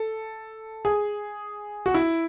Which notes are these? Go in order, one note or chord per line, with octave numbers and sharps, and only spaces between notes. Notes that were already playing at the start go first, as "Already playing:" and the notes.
Already playing: A4
G#4
F#4
E4